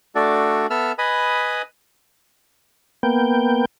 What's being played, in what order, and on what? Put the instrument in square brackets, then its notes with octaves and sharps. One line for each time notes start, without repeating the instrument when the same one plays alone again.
[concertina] A3 D4 F#4 A4 D5
B3 A4 E5 E6 F6
B4 D#5 G#5 B5 D#6
[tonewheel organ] A#3 B3 G5